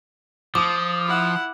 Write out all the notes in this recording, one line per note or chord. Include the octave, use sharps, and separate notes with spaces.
F3 D6 D#6
E4 F#5